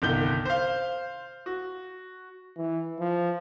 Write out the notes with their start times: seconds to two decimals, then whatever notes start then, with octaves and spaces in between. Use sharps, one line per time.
0.02 G1 C2 D#3 G6 G7
0.46 C5 F5
1.46 F#4
2.57 E3
2.99 F3